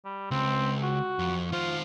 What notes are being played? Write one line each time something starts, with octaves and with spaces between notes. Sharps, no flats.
G3
C#2 C4
F#4
F2
D#3 F4 C5